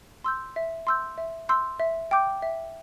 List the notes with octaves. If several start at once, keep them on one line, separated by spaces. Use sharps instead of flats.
C6 E6 G6
E5
C6 E6 G6
E5
C6 E6 G6
E5
G5 D6 G6
E5